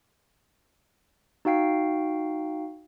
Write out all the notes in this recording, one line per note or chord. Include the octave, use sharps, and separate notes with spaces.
D#4 F#4 F5 G5 C7